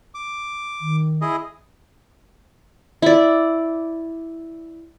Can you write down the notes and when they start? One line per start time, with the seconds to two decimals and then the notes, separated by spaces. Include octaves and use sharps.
0.14 D6
0.81 D#3
1.21 E4 G#4 D#5
3.02 E4 D5